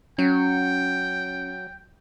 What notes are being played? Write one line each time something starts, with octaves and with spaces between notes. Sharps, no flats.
F#3 C#4 G5